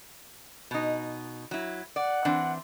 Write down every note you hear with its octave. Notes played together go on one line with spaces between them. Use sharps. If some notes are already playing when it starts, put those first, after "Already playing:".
B2 D#4
F#3 E4
D5 F#5
E3 C4 D4